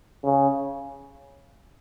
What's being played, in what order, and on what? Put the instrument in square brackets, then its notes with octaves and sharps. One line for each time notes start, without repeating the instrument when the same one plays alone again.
[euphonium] C#3